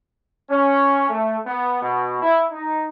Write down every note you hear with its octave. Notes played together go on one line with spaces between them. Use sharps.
C#4
A3
B3
B2
E4
D#4